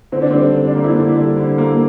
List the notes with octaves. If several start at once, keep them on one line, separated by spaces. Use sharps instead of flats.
D3 C4
D4
G3 C4
D3
D4
A#3
E4
D3 D4
G3
D3
A#3